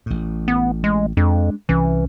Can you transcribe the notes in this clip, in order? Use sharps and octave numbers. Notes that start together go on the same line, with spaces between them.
A1 A2
B3
G#3
F2 G#3 D4
C2 E3 C#4